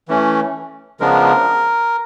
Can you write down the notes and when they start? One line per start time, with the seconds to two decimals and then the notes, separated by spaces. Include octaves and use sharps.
0.08 E3 A3 C#4
1.00 C#3 F3 G#3 B3 D4 A#4